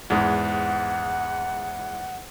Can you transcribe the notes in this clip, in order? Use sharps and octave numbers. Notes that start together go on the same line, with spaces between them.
E2 G#2 F#5